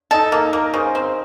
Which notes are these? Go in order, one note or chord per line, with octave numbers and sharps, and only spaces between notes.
D#4 A4
A#3 D#4
A#3 A#4
C#3 C5
C4